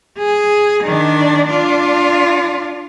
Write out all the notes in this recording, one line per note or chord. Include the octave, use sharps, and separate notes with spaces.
G#4
D#3 D4
D4 F4